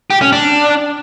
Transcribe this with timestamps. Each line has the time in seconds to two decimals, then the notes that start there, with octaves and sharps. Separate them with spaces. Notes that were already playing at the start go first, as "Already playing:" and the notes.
0.10 G4
0.21 C#4
0.33 D4